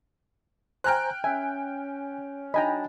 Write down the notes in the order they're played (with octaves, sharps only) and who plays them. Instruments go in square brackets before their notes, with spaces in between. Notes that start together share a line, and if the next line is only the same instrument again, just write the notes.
[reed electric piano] C5 G#5 A#5 [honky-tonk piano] G5 F6 F#6
[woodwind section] C#4 [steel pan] E5 [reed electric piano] G#5
[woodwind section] F#3 D4 D#4 [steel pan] D#5 A#5 [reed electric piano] G5 G#5 B5